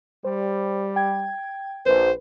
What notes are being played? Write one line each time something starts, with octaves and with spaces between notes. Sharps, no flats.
G3 C5
G5 G#6
A#1 B4 C5